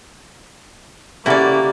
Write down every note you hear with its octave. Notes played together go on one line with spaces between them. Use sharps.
C#3 A3 A#3 E4 F#4 G4 D5